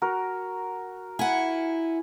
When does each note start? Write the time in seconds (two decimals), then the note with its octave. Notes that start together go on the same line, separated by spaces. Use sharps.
0.02 F#4 A#4
1.19 E4 F#5 G#5